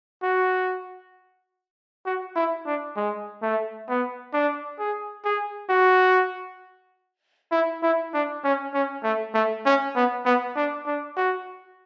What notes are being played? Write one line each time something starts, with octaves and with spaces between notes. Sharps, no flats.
F#4
F#4
E4
D4
G#3
A3
B3
D4
G#4
G#4
F#4
E4
E4
D4
C#4
C#4
A3
A3
C#4
B3
B3
D4
D4
F#4